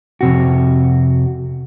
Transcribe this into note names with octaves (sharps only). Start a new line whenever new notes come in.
F2 C3 F#4